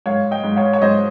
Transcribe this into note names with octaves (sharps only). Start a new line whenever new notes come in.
G#2 C#5 F5
D#5 G5
G#2
C#5 F5
C#5
G#2 C5 D#5